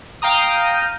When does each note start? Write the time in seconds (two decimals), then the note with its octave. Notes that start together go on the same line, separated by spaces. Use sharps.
0.22 F5 G5 A#5 D#6